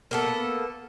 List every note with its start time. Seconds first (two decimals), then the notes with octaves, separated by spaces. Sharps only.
0.11 A#3 B3 A4